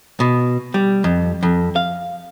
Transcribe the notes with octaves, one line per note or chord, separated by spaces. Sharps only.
B2
G3
F2
F2
F5